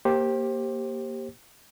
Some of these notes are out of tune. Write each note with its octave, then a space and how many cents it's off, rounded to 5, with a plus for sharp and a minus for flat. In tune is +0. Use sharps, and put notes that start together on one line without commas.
A#3 +5 G4 +0 C5 +25